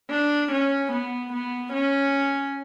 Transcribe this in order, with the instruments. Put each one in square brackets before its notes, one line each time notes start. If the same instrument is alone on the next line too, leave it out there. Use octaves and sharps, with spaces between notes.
[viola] D4
C#4
B3
B3
C#4